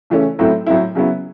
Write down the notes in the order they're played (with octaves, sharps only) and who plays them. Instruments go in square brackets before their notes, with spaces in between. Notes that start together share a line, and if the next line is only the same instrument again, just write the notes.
[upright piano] C#3 E3 A3 C#4
A2 F#3 A3 C4 E4
A2 F#3 A3 C4 E4
C#3 F#3 B3 E4